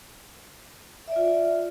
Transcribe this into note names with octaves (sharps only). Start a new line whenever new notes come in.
F4 D5 E5